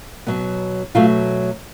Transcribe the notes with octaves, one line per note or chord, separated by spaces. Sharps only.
B2 F#3 B3
B2 F#3 A3 F4